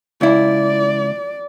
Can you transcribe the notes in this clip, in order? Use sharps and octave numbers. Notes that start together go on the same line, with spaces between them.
C#2 E4 D5